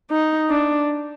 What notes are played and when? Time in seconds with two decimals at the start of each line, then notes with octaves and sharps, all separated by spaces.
0.10 D#4
0.50 D4